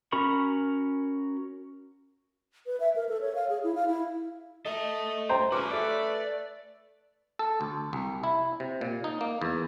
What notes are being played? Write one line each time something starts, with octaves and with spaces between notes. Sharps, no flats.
C#4 F#4 A#4 B5 C#6
B4
E5
A#4
A4
C#5
F5
G#4
E4
F5
E4
A4 D#5 E5
C5 G5 A#5
C#4 F#4 G#4 B4 D6
A3 D5
A4
D2
C2
E4
C3
A#2
D#4
A#3
E2